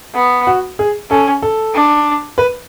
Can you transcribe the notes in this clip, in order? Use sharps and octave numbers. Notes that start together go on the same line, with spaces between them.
B3
F#4
G#4
C#4 A4
A4
D4
B4